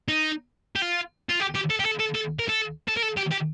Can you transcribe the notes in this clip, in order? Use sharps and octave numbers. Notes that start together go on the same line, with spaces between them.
D#4
G4
F4
F4
G4
G4
A4
G4
A4
A4
A4
A#4
A4
A4
A#4
A4
G4
G4